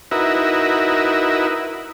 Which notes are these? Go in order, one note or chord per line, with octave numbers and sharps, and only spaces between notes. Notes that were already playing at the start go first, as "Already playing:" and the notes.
D#4 E4 F#4 A#4 B4 E5